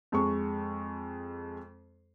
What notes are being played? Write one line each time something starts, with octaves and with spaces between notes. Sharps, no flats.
F2 G#3 C#6